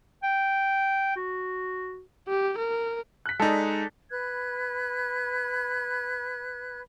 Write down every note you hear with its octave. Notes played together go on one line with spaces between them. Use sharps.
G5
F#4
G4
A#4
F#6 B6
G#3 D#4 A4 D5
B4 B5 F#6 G#6